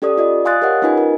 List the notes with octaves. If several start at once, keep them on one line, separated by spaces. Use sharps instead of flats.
C#4 G4 A4 D5 D#6
F4 D5 D#5
F5 G#5 C6 D#6 F#6 A6
G4 A#4 C#5 D#5 F#5
C#4 D#4 F4 B4 D#5 G#5
A#4